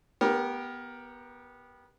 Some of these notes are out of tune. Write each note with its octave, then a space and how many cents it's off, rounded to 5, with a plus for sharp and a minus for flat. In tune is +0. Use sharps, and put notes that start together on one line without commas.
B3 -15 G4 +0 A#4 +10